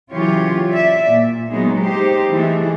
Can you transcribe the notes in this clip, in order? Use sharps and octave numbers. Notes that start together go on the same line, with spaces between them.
C#3 E3 F#3 F4 G4 C#5
D5 E5
A#2
F#3 G#3 B3 D#4
D#4 G4 C5
E3 G#3 A3